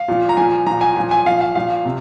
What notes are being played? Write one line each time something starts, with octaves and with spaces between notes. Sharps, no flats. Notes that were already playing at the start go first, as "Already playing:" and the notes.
Already playing: F5
A#2 F3
A#5
A#2 F3 G#5
A#2 F3 A#5
G#5
A#2 F3 G#5
G#5
A#2 F3 F5
F5
A#2 F3 F5
C3